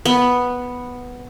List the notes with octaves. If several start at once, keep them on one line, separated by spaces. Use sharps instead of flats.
B3